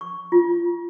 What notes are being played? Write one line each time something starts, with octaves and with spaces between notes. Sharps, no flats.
C#6
F4